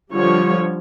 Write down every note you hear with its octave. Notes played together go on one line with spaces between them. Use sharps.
D3 F3 G3 C#5